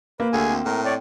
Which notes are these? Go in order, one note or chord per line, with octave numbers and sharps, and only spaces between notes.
A#3 B4
D2 G#4 A4 G#5
C4
A2 A#4
C#5 D5